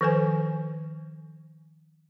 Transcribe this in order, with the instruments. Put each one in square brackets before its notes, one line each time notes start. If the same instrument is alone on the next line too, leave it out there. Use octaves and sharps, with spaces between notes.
[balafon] D#3 F3 A4 B4 C5 G#5